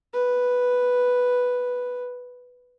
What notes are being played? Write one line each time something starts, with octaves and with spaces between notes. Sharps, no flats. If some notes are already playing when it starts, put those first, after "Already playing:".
B4